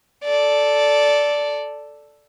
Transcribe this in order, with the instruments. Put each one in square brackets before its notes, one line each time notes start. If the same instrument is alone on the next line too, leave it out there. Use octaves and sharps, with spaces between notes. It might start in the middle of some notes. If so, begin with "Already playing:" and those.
[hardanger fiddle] A4 D5